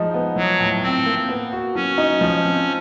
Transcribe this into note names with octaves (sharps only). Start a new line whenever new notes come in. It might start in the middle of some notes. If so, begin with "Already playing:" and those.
Already playing: F3 G#3 D#4
B3
F3 F#3
A2
A2 C4
A#3
B3
F#4
F#3 C#4
D#4
F3
C4